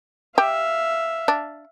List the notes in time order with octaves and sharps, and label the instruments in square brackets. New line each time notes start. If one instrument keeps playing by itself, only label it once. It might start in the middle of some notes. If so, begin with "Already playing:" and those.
[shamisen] G4 [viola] E5 F5
[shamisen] D4